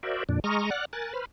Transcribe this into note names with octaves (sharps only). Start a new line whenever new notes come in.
F#4 A#4 C5 D5 E5
F2 A#2 D4
G#3 A#5 C#6 D#6 F6
D5 F#5 F6 F#6
A#4 G#5 F#6 A6
B4 C5 B5 F6